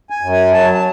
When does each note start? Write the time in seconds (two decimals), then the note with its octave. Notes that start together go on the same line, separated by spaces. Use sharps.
0.10 G#5
0.21 F#2
0.32 G#5
0.53 F#3 A5
0.73 A5